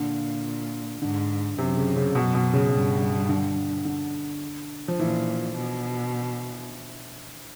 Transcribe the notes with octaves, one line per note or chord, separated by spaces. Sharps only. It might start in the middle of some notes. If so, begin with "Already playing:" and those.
Already playing: A#2 D3
G#2 D3
F#2 C3
C#3
C#3
F#2 B2
B2
C#3
G2
D3
D3
F3
A#2 E3
B2